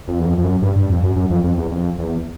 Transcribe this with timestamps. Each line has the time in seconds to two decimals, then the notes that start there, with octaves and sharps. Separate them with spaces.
0.08 F2
0.19 E2
0.26 F2
0.38 F2
0.44 F#2
0.62 G2
0.76 G2
0.90 F2
1.03 F#2
1.16 F#2
1.30 F2
1.44 F2
1.58 E2
1.71 F2
1.98 E2